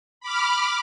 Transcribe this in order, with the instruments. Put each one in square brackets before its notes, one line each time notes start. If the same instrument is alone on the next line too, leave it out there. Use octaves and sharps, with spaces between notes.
[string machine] B5 D6 F6